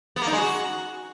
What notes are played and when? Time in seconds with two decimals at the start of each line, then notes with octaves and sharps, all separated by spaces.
0.16 B3
0.22 A#3
0.27 D#4
0.32 G#3
0.38 F#4